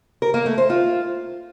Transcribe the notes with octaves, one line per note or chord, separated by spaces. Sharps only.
A#4
A#3
A3
C5
F4